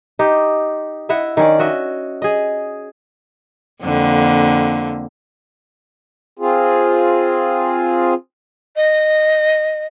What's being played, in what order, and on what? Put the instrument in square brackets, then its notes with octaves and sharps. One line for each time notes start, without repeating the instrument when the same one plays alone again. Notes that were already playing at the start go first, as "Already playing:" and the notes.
[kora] D#4 G4
E4 D#5 E5 F#5
D#3 C#4 D5
F#4 D#5 E5
G#4 D#5
[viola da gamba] F2 D3 A#3
[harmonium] C4 F4 G#4
[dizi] D#5